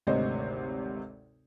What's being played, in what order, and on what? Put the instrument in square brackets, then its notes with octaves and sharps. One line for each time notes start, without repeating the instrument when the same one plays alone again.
[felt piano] G#1 D2 C3 C5 C#5 D#5